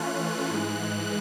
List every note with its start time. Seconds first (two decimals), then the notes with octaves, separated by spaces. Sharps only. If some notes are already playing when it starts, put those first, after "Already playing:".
Already playing: E3 A3 C#4 F4 F#6
0.51 G#2 E3 G#3